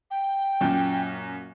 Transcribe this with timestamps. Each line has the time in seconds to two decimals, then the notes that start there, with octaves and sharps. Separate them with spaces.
0.11 G5
0.61 F#2 A#2